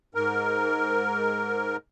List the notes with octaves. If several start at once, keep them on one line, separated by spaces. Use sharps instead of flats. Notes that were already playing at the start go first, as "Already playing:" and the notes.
G#2 A#4